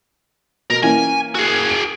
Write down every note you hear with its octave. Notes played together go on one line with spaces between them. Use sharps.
B2 A#4
E3 A#3 C#4 G#5
F#4 G#4
D7